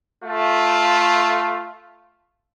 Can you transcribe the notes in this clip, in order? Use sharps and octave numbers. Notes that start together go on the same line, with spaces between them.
A3 F4